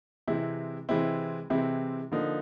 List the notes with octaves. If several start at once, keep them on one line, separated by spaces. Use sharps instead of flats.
C3 E3 G#3 C4 E4
C3 E3 G#3 C4 E4
C3 E3 G#3 C4 E4
D3 F3 A#3 D#4